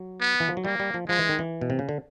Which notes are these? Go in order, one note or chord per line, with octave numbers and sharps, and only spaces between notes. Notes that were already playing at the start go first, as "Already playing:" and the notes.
Already playing: F#3
B3
E3
F3
F#3
G3 A#3
G3
F3
F3 G#3
E3
D#3
E3
B2
C3
C#3
D3